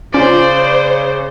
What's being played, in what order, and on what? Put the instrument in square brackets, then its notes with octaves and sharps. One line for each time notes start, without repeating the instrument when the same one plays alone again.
[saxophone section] C#3 [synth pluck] C#4 F4 [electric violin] C5 [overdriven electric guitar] D5